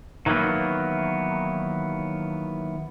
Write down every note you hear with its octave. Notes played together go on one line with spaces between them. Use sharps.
D#3 E3 F#3 A#3 B3